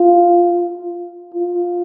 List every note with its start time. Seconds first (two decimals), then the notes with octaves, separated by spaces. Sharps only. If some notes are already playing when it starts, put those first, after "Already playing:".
Already playing: F4
1.34 F4